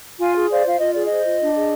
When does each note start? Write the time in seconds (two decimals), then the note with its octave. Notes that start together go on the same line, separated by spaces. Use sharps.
0.21 F4 F5 G#5
0.37 G#4
0.51 C5 D5 F5
0.66 F4 F5
0.79 F4 D#5
0.92 G#4 D5
1.05 D#5
1.10 C5
1.25 F4
1.40 D4
1.55 G#4